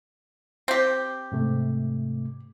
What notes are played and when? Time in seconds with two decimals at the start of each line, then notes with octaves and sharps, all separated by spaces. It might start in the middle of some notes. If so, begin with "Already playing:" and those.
0.68 C4 G4
1.32 G#2 C3 A3